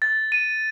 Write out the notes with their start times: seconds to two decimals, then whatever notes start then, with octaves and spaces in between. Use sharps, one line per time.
0.02 A6
0.32 D#7